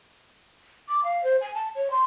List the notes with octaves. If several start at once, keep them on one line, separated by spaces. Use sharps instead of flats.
D6
F5
C5
G#5
A5
C#5
C6